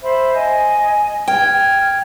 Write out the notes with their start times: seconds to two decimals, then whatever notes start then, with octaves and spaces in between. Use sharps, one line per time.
0.03 C5 E5 B5
0.34 D#5 G#5
1.28 G5 F6 G#6